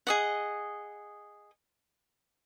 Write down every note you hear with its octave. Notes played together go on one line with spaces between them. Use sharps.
G#4 D#5 F#5